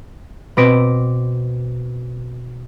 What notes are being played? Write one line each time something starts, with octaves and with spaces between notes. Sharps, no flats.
B2 C4 D6 A#6 B6 D7